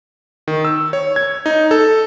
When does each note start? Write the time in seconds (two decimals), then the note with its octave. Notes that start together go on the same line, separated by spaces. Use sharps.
0.48 D#3
0.65 E6
0.93 C#5
1.16 G#6
1.46 D#4
1.71 A4